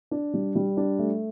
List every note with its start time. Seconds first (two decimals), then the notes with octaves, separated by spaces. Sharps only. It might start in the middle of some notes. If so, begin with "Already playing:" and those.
0.11 D4
0.34 G3
0.55 G3
0.77 D4
0.99 A3